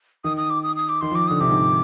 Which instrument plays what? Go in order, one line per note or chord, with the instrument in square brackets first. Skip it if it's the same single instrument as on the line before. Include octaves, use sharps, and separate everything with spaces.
[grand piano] D#3 [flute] D#6
[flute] D#6
D6
D#6
D#6
D6
[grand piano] D#3 [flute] C6
[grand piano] F3
[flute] D6
[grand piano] D3 [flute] D#6
[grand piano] C3 [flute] D6
[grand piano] G#2